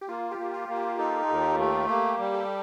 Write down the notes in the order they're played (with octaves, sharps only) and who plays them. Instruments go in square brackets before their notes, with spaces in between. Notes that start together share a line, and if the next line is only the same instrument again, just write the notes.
[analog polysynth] G4
[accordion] A#3 [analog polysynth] F4
[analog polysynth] G4
[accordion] A#3
[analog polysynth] F4
[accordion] A#3
[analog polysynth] G4
[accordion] D#4 [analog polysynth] A4
[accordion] D#2
[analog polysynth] G4
[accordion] A3
[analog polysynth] F4
[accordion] A#3 [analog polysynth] G4
[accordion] G3
[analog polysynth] A4